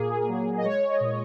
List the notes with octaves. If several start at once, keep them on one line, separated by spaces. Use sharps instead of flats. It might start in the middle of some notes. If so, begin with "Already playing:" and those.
Already playing: A#2 A#3 G#4
F#3 G#4
D#5
G#3 C#5
D#5
A#2